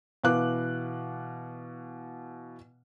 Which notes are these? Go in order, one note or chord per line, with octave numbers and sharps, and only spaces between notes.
B2 E3 B4 F5 D6 F#6